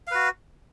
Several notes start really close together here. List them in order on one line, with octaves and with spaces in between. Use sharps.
F5 B4 F#4